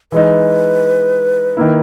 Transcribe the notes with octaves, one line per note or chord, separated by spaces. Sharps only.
E3 G#3 D#4 B4
D#3 A#3 E4